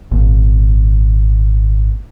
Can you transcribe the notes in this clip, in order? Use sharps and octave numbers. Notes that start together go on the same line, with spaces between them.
G#1 A#2